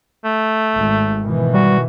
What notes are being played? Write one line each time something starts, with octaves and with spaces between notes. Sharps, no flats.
A3
G#1
B2 D#3 E3
G3 F#4